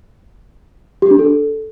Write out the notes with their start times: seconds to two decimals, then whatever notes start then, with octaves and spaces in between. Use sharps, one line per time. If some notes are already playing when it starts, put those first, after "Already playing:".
1.02 G4
1.11 D4
1.19 A4